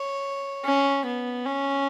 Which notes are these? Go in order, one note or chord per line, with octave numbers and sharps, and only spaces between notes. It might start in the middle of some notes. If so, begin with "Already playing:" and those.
Already playing: C#5
C#4
B3
C#4